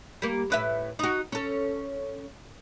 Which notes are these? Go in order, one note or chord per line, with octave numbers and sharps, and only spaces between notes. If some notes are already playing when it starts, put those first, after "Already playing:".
G3 A#3
A2 B4 E5
D#4 F#4
C#4 A4